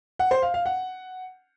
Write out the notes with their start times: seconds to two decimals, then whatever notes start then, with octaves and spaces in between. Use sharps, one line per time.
0.19 F#5
0.31 C5
0.43 F5
0.54 F5
0.66 F#5